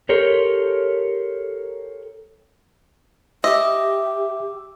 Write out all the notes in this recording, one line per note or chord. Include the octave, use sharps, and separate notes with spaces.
G4 A4 A#4 C5 C#5
G4 D#5 E5 D6 E6